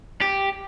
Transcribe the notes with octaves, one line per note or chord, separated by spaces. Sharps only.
G4